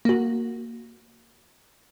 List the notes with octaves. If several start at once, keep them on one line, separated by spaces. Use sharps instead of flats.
A#3 F#4